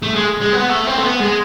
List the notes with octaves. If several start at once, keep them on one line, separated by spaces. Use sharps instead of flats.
A3
G#3
G#3
B3
A3
C4
A3
B3
G#3